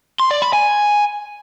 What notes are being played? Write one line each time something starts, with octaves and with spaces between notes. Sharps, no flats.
C6
D5
B5
G#5